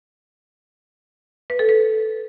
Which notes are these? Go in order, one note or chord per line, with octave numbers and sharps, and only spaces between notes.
B4
A4
B4